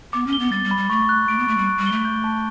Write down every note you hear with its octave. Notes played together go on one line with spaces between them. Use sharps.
B3 D6
C#4
G7
B3
G3 A6
G3
B5
G3
A3 C#6
F#6
A3 D7
B3
A3 C#6
G3
F#6
G3
G7
A3
G6
A5